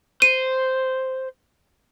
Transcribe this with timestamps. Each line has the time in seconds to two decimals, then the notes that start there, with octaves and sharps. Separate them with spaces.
0.22 C5 D#7